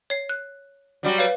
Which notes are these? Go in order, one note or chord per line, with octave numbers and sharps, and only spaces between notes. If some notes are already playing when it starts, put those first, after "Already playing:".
C#5 C7
F#6
F#3 G3 F#4
B4 C#5 F5